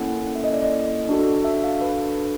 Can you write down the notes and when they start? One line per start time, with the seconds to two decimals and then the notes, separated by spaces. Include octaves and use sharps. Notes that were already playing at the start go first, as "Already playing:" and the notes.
Already playing: A#3 C#4 E4 A4 F#5
0.35 E5
0.44 D#5
0.53 D5
0.63 D#5
1.09 D4 F#4 A4
1.45 E5
1.64 F5
1.81 B4